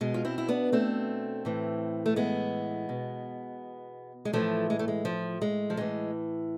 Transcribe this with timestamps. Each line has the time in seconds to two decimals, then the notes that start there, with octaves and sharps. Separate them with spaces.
0.01 B2 G#3
0.14 F4
0.25 C4 E4
0.38 E4
0.49 B3 D4
0.72 A3 C4
1.45 A2 E3
2.06 A3
2.16 G#3 B3
2.89 B2
4.25 G#3
4.33 A2 E3 F3 A3
4.70 G#3
4.79 A3
4.88 G#3
5.05 F3
5.42 G#3
5.70 F3
5.77 A2 E3 G#3